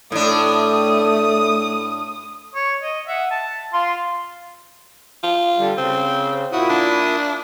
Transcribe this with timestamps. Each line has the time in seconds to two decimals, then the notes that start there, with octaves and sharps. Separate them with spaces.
0.12 A2 A3 D4 D#6
2.55 C#5
2.81 D#5
3.08 E5 F#5
3.31 A5
3.73 F4 C6
5.23 F4
5.58 D3 G3
5.77 C#3 C4
6.53 A#2 E4 F#4 D#6
6.69 D4